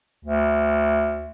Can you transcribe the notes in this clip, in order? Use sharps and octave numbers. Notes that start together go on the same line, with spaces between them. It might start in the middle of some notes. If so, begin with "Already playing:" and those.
D2